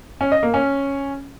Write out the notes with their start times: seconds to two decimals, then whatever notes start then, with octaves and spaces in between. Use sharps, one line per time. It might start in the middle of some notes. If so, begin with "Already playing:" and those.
0.21 C#4
0.32 D#5
0.43 A#3
0.54 C#4